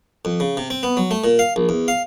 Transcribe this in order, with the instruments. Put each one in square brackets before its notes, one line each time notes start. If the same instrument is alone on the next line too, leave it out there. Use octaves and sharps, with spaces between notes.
[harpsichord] F2
C#3
C3
C4
B3
F#3
A3
A#2
F5
A#1
E2
F5